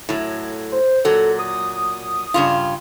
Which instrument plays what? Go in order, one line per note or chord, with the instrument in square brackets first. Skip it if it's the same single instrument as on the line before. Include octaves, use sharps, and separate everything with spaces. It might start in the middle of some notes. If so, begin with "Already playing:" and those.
[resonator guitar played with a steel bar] A2 F#3
[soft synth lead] C5
[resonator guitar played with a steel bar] A#2 F#3 [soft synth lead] A4
[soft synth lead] D#6
[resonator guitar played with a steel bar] G2 C#3 F4